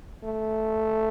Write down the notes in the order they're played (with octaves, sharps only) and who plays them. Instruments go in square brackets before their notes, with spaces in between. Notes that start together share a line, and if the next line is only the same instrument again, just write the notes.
[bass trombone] A3